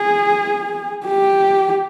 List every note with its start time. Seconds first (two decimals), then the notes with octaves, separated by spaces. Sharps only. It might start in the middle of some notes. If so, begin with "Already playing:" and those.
Already playing: G#4
1.06 G4